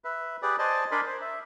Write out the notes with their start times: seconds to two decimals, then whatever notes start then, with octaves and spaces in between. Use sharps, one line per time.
0.04 B4 E5
0.42 G4 G#4 B4 D5
0.59 C5 D5 D#5 G#5 A5
0.91 D4 A#4 D5 G#5 B5 C6
1.07 C5
1.21 E5